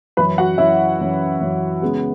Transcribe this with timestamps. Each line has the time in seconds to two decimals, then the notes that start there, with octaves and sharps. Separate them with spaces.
0.17 F#2 E3 C#4 B4 B5
0.38 F#4 F#5
0.58 F#2 E3 C#4 E4 E5
1.00 F#2 E3 C#4
1.40 F#2 E3 C#4
1.82 C#3 G#3 B3